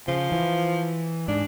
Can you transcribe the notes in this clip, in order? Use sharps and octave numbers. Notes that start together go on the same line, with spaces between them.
C#3 F3
E3
G#2 D4